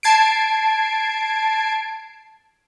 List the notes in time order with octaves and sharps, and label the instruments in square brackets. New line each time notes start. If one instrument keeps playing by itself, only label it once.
[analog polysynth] A5 G#6 C7 D7